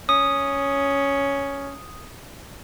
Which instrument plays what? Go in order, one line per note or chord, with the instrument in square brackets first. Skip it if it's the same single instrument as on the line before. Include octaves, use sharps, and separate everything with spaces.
[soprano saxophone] C#4 [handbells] D#6